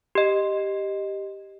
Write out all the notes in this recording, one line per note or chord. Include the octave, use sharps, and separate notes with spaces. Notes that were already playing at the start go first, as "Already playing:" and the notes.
G4 D#5